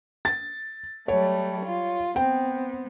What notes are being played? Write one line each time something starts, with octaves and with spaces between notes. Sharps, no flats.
A6
F#3 G3 A3 C#5
F4
B3 C4 G5